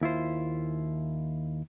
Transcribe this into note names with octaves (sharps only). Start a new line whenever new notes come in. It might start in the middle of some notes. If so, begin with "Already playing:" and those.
D#2 E4 F4 C5